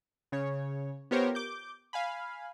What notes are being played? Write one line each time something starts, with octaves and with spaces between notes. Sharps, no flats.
C#3 C#5
B3 F4 G4 A#4 C5 C#5
D6 G6
F5 G#5 B5